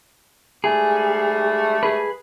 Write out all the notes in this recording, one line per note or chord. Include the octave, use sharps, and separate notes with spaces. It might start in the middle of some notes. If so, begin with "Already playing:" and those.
G#2 G3 A3 G#4
G#4 B4